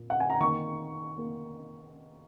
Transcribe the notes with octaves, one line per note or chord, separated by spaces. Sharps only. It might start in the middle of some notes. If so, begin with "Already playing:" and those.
Already playing: A#2 A#3
F#5
G#5
A#5
D#3 A#3 C#6
A#3